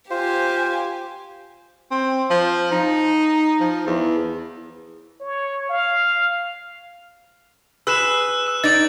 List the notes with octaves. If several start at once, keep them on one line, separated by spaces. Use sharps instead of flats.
F4 G4 C5 G#5
C4
F3
D#4
F3
E2
C#5
F5
G#4 B4 E6 F#6 E7
E6 E7
D#4 D5 A6